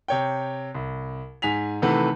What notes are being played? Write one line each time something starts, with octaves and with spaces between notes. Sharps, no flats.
C3 C#5 G5
C2
G#2 G#5 B6 F7
C3 D#3 E3 A3 B4 F#5